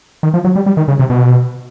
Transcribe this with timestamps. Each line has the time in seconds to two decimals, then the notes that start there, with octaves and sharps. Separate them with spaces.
0.23 D#3
0.34 F3
0.44 F#3
0.56 G3
0.66 G3
0.77 D#3
0.88 C#3
0.99 C3
1.10 B2